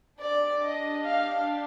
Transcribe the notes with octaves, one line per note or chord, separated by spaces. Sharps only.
D4 G4 D5
D#5
F5